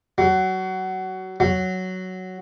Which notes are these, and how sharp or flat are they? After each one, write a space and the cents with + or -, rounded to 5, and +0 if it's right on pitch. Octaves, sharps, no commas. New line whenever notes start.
F#3 +20
F#3 +5